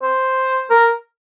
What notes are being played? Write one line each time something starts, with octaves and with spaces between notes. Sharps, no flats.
C5
A#4